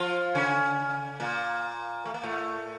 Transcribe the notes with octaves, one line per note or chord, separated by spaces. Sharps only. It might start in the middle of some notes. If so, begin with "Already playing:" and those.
Already playing: F3 F4
C#3 C#4
A#2 A#3
A3
A#3
A2 A3